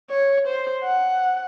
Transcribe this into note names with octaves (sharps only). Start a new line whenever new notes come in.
C#5
C5
F#5